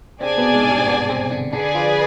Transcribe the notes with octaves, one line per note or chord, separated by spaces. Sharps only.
C3 C4 D4 G#4 D5 G#5
B2 B3
G#2 G#3
G2 G3
C4
B2 B3
C3 C4
D3 D4
D3 D4 G#4 B4 D5 G#5
F3 F4